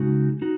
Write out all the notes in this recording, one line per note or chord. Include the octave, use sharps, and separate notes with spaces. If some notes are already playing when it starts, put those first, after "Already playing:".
Already playing: C#3 G#3 D#4 F#4
D#4 F#4